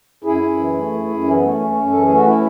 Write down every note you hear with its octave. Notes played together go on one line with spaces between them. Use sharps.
F#2 E4 G#4
F#2
E3
A3
F#2
F#2
E3 C#4
B3
A3 C#4
F#2
F#2
E3 A4
G#4
A3
F#4
C#4 E4